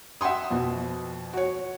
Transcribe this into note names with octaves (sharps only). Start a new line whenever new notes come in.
E5 F#5 G5 C6 D#6
F2 B2
F#4 C#5